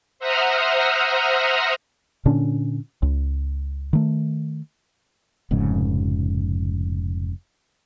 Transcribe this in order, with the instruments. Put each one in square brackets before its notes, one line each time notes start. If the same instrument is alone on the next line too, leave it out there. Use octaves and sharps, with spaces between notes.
[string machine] C5 E5 F#5 A#5 D#6 F6
[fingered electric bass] A#2 D3 C#4 D4
C#2
D#3 A3
[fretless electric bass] F1 F2 G#2 C#3